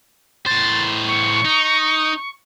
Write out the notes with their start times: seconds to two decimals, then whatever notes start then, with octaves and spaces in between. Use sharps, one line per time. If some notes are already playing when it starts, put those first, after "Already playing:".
0.47 A2 C5 A6
1.07 C#6
1.45 D#4